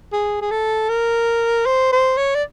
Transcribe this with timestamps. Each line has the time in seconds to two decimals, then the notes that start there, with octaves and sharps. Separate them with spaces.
0.13 G#4
0.41 G#4
0.51 A4
0.89 A#4
1.66 C5
1.92 C5
2.17 C#5
2.35 D5